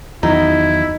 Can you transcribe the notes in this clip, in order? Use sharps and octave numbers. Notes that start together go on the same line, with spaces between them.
E2 D#3 F#3 D#4 E4